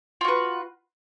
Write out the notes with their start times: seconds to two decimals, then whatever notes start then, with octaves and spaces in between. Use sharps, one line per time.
0.21 F4
0.24 F#4
0.28 B4